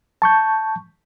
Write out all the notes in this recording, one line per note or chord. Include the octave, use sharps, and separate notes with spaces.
A5 C#6 G6